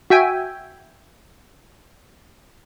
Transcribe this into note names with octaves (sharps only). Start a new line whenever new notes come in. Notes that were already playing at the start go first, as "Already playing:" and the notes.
F#4 E5 G5 G#5